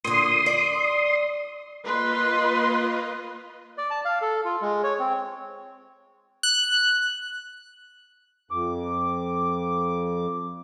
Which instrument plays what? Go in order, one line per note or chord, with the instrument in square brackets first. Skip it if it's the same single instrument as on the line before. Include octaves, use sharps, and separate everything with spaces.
[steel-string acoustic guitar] A#2 D3 [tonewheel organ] C6 D#6
[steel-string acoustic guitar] D5
[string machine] A#3 F4 D#5 [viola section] B4 C6
[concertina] D5
A5
F5
A4
F4
G#3
C#5
C4
[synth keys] F#6
[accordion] F2 D6